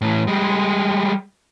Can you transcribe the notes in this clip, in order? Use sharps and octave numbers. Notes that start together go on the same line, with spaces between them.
A2 E3
G3 G#3